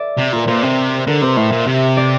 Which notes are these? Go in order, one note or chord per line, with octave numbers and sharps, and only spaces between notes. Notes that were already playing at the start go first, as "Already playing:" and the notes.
Already playing: D5 E5
C3
A#2 A#4
A#2 C5
C3
D3 A#4
C3 C5
A2 E5
A#2
C3
D5